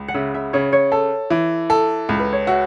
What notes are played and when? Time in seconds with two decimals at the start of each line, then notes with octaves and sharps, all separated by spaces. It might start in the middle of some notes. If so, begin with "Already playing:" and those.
Already playing: C#2
0.08 F#5
0.14 C#3 E5
0.34 E5
0.53 C#3 C#5
0.73 C#5
0.92 A4
1.30 E3
1.70 A4
2.09 C#2
2.20 B4
2.33 C#5
2.47 F#4 E5